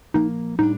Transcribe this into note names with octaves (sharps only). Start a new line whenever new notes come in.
A#2 F3 A#3 D#4
A2 G3 D4 D#4